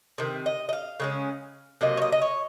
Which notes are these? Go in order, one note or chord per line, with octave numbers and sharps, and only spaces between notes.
C3 D#3
D#5
D#5
F5
C#3 G#3 C#4
C3 F#3 A#3 D#5
C#5
D#5
D#5
C#5